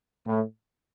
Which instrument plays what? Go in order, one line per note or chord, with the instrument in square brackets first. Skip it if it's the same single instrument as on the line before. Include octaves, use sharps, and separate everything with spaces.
[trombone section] A2